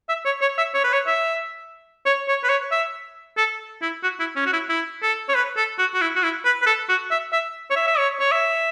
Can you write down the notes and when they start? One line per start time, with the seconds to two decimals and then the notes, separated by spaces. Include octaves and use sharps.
0.09 E5
0.25 C#5
0.41 C#5
0.58 E5
0.74 C#5
0.84 B4
0.93 C#5
1.07 E5
2.06 C#5
2.28 C#5
2.44 B4
2.50 C#5
2.72 E5
3.38 A4
3.82 E4
4.03 F#4
4.20 E4
4.36 C#4
4.46 F#4
4.53 E4
4.70 E4
5.03 A4
5.29 C#5
5.35 B4
5.57 A4
5.79 F#4
5.94 F#4
6.01 E4
6.16 F#4
6.23 E4
6.45 B4
6.62 B4
6.66 A4
6.89 F#4
7.11 E5
7.33 E5
7.71 C#5
7.76 E5
7.87 E5
7.98 C#5
8.20 C#5
8.32 E5